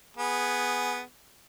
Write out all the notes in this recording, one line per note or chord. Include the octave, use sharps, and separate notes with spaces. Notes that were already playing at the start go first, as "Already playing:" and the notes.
B3 G#4